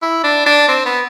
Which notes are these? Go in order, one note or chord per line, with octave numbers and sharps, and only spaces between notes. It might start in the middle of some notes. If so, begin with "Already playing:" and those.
E4
D4
D4
C4
B3